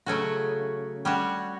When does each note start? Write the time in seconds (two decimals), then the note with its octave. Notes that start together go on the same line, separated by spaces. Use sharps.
0.06 C#3 F#3 A3 C#4 F#4
1.05 G3 C#4 F#4